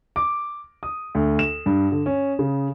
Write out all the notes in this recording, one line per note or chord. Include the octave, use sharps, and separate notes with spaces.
D6
D#6
D2
E7
G2
D3
C#4
C#3